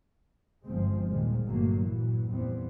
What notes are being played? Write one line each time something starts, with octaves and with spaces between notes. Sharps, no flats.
G1 F3 G#3 C4
D#2 A#2 D#3 F3 G3 G#3
G1 G2 A#2 F#3 A3 A#3
A#2 E3 F#3
F2 A#2 E3 G3 B3 C4